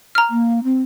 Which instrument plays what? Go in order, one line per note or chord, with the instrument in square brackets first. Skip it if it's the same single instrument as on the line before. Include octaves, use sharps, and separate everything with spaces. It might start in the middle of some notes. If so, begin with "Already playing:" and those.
[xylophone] A#5 F6
[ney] A#3
C4